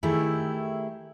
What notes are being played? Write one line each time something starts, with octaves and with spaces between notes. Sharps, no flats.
D#3 A3 E4 G4 G#4